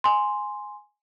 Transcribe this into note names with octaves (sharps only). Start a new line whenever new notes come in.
G#5 C6